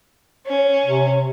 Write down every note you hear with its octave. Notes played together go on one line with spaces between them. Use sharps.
C#4
C3